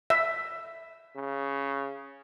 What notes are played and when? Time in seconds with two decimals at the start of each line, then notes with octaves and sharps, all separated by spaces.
0.10 E5
1.16 C#3